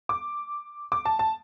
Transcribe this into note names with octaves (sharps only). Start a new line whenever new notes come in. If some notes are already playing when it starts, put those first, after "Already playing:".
D6
D6
A5
A5